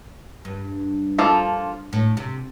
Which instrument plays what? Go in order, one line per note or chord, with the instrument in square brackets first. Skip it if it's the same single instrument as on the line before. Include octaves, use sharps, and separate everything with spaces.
[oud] G2
[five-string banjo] F3 A#3 F4 A4
[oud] A2
C3